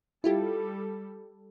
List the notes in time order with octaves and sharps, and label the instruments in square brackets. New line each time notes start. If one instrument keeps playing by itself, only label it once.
[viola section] G3 A4 [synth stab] E4 F4 G4